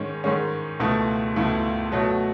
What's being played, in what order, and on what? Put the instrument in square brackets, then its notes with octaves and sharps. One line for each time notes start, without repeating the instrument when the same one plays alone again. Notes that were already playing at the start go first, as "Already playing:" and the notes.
Already playing: [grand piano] G#2 D#3 G#3 C#4
G#2 D#3 G#3 C#4
C#2 B2 A3 E4
C#2 B2 A3 E4
B2 F#3 A3